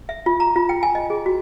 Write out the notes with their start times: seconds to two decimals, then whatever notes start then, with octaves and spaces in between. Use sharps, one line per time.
0.09 E5
0.26 F4
0.40 A#5
0.56 F4
0.69 G5
0.83 G#5
0.95 D#5
1.10 G#4
1.26 F#4